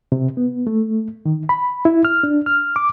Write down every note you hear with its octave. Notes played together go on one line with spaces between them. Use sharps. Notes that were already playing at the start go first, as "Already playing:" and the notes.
C3
B3
A3
D#3
B5
E4
F6
D4
F6
D6